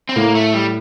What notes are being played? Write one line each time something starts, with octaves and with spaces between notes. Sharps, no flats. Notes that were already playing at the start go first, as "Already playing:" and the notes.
C4
A2 A#3
A3
G3